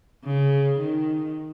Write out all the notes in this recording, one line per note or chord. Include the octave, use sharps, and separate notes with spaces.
C#3
D#3